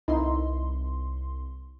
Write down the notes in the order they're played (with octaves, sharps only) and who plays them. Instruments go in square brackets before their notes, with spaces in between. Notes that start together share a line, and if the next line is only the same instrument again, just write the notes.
[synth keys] C2 C6 [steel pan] D#4 E4